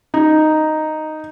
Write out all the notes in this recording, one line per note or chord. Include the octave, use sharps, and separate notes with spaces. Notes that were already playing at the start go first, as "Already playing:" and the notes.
D#4